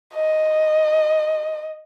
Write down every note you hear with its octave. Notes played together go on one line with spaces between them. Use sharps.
D#5